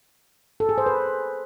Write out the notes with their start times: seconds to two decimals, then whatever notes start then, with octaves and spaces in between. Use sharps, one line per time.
0.60 A4
0.69 G#4
0.78 C5
0.86 B4